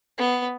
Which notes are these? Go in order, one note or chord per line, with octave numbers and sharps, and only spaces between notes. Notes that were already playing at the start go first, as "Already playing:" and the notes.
B3